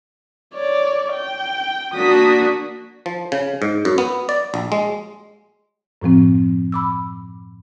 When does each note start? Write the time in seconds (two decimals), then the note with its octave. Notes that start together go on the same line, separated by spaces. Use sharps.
0.55 C#5 D5
1.14 G5
1.94 A#3 D4 F#4 D#6 B6
3.06 F3
3.32 C#3
3.62 G#2
3.85 F#2
3.98 B3
4.29 D5
4.54 A#1
4.72 G#3
6.02 F#2 A2 F3 C4
6.72 B5 D6 E6